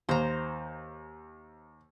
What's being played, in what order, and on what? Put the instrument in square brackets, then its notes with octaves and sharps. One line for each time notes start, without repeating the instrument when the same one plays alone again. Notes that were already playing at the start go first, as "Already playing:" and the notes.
[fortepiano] D#2 [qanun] C5 A#5